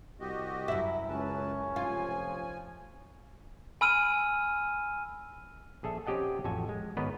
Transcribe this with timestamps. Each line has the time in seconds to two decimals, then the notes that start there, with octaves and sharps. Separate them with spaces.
0.20 C2 F#4 G4 D#5
0.68 F#2 E4
1.08 C#2 F#3 C#4 B4 A5
1.76 F1 F3 F4 G#5
3.81 G#5 B5 E6 F6 D#7
5.83 A#1 G#4 A4 E5
6.06 C4 C#4 G4 D#5 F#5 A5
6.44 A1 F2 F#4 A4 G#5
6.69 G#3
6.97 G#1 B3 A#4 B4 C#5 D#5